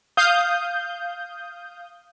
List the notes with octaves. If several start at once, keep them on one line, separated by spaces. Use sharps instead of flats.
F5 D#6 G6